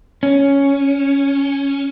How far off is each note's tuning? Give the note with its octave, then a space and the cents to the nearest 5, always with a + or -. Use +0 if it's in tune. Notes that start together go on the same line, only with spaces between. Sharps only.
C#4 +5